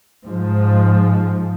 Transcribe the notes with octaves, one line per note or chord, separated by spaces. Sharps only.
G#2 F3